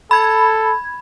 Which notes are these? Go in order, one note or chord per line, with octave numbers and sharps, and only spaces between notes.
A4 B5 G#6